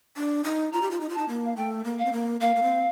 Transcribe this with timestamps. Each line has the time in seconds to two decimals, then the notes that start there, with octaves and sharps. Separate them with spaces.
0.16 D4
0.44 D#4
0.72 F4 A#5
0.82 G4
0.91 F4
1.01 D#4
1.09 F4
1.15 D#4 A5
1.28 A#3
1.45 F5
1.56 A3 G5
1.85 A#3
1.99 F5
2.05 C4
2.13 A#3
2.41 A#3 F5
2.56 A#3
2.63 C4